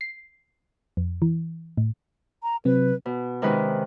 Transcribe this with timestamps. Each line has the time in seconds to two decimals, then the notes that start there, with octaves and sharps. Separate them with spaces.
0.01 C7
0.97 F2
1.22 E3
1.77 A2
2.43 A#5
2.65 C3 F#3 C4 B4
3.06 B2
3.42 C3 D#3 G#3 C#4 B4